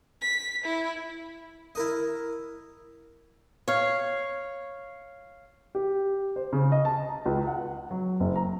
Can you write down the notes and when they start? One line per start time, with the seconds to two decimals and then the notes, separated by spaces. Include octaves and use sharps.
0.21 B6
0.64 E4
1.75 E4 A#4 D#5
3.68 C#5 F5
5.75 G4
6.36 C5
6.53 C#3
6.72 D#5
6.85 A5
7.09 A#5
7.26 C#2
7.47 F#5
7.91 F#3
8.20 F#1
8.36 A#5